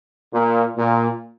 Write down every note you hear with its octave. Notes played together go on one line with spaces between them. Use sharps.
A#2
A#2